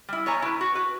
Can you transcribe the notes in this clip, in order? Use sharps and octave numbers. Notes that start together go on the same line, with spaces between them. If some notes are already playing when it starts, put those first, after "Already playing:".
G3 E4
B2 C#5 G#5 A#5
E4 B4
F#4
B4